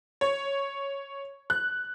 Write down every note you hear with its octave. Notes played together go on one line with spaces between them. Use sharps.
C#5
F#6